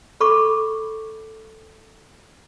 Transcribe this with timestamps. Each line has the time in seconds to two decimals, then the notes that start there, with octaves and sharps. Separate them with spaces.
0.21 A4 B5 C#6 D6